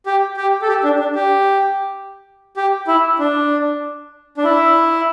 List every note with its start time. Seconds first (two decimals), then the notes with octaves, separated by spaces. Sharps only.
0.06 G4
0.37 G4
0.62 A4
0.69 G4
0.84 D4
1.00 D4
1.15 G4
2.57 G4
2.88 E4
3.19 D4
4.37 D4
4.44 E4